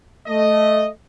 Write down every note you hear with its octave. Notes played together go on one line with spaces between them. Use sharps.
A3 D#5